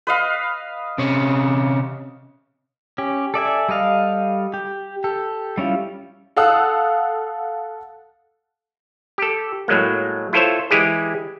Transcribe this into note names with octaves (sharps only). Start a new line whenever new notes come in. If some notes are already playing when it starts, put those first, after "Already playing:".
B4 D#5 F5
C3 C#4
C#4 G4
A4 D5 E5 G#5
G3 A4 D#5 F5
G4
G4 A4
G3 C#4 E4 F4
A4 F5 F#5 D#6 E6 F#6
G4 A4
A2 F#3 G#3 A#3
E4 F4 A4 C5 C#5 E5
E3 G#3 E4 G4 G#4